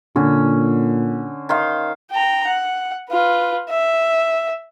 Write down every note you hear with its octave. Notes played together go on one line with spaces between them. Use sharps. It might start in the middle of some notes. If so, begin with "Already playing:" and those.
A#2 D3 C#4
D#3 C5 F5
G5 A#5
F#5
F4 B4
E5